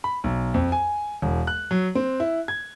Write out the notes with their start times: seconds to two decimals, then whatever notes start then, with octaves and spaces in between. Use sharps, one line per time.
0.04 B5
0.24 B1
0.54 F2
0.72 G#5
1.22 E1
1.47 F#6
1.71 F#3
1.95 C4
2.20 E4
2.48 G#6